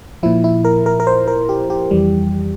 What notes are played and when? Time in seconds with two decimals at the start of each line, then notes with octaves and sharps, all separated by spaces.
0.23 A#2 F3 E4
0.44 E4
0.65 A#4
0.86 A#4
1.00 A#4
1.07 C5
1.27 A#4
1.49 G4
1.70 G4
1.91 F2 E3 G3